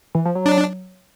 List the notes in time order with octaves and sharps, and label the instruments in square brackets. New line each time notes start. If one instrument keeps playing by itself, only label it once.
[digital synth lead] E3
F3
F#3
[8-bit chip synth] D4